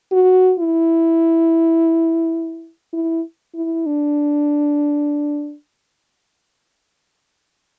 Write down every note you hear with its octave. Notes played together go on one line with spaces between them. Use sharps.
F#4
E4
E4
E4
D4